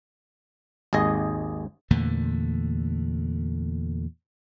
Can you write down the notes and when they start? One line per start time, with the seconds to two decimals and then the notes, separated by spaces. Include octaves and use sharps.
0.93 G#1 D#2 G#4 D#5
1.91 E2 A#2 D3 A3